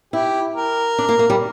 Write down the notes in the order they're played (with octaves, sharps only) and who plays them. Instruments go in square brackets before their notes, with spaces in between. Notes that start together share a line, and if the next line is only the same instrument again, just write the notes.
[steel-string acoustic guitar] E4 [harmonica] G4
[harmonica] A#4
[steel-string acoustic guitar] D4
A#3
A#3
G3